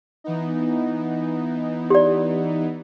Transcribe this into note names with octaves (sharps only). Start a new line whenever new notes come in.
E3 B3 D#4
G4 D5